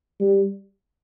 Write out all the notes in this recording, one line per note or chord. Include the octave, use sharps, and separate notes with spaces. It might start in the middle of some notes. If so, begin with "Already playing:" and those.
G3